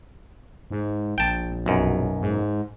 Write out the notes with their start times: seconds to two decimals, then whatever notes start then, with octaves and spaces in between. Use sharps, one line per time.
0.71 G#2
1.18 A#1 G5 A5
1.66 B1 F#2
2.21 G#2